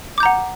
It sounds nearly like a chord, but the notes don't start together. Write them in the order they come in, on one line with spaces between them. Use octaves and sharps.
D6 G6 A#5 F#5